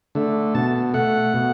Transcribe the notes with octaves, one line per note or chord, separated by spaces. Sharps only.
D3 A3
B2 A5
A3 F#5
B2